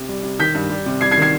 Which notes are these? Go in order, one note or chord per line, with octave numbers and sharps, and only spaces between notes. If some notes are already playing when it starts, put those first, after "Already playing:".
Already playing: C3
G3
C3
D#3 G6 B6
G2
G3
C3
G3 G#6 C7
G#6 C7
D#3
G#6 C7